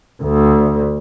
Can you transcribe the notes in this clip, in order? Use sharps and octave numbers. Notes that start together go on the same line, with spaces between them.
D2